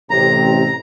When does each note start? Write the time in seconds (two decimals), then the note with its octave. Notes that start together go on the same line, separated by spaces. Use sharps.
0.10 A1 C3 A#5